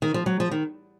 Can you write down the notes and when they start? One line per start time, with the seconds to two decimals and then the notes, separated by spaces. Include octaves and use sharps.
0.02 D#3
0.14 F3
0.26 F#3
0.40 F3
0.51 D#3